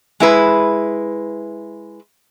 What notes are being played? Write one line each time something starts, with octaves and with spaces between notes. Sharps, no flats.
G#3 E4 B4